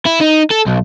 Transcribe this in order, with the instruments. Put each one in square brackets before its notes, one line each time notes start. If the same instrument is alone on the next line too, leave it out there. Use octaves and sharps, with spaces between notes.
[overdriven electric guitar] E4
D#4
A4
B1